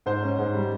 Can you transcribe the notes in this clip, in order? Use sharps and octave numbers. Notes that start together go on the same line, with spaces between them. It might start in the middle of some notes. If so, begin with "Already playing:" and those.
G#2 C5
C#4
G#2
G3